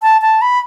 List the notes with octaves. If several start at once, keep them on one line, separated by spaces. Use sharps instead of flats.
A5
A5
B5